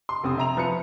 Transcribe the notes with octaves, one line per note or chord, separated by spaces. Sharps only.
C6
F1 C4 D#6
E5 A#5 F7
F3 B4 C#7